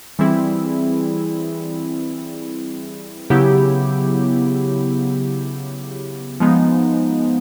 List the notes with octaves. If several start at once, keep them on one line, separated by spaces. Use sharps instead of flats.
E3 G3 C4 E4 G#4
C#3 F#3 B3 E4 G4
F3 G#3 B3 D#4